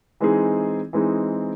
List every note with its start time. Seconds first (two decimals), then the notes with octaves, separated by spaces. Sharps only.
0.20 E3 G#3 C4 D#4 G#4
0.93 E3 G#3 C4 D#4 G#4